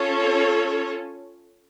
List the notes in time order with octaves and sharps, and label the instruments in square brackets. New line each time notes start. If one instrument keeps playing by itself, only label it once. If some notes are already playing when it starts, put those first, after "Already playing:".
Already playing: [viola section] C#4 F4 A4 C#5